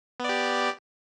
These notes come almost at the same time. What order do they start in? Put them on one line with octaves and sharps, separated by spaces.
B3 D5 G4